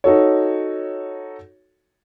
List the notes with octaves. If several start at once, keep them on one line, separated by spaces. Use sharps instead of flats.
D#4 F#4 A4 C#5